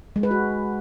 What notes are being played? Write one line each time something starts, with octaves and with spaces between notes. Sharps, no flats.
G#3
B4
F#4